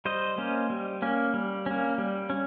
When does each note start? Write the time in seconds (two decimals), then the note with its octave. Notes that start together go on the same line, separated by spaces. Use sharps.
0.05 G3 C5 D#5
0.38 A#3 C#4
0.70 G3
1.02 A#3 C#4
1.34 G3
1.66 A#3 C#4
1.98 G3
2.30 C#4